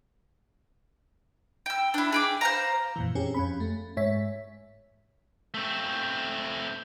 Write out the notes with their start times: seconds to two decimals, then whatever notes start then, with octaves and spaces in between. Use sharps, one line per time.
1.66 G5 E6
1.94 D4 E4
2.13 G#4 G5 D6
2.41 C5 F5 A#5
2.96 F2 A#2 E3
3.15 C4 C#4 G4 G#4
3.34 F2 C#4 B5
3.60 A3
3.97 G#2 G#3 C#5 E5 B6
5.54 A3 C4